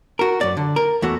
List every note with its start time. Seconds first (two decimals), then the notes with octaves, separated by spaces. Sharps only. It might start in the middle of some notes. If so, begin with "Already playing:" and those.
0.19 F#4 A#4
0.41 F#2 D5
0.57 D3
0.76 A#4
1.02 E2 A3 F#4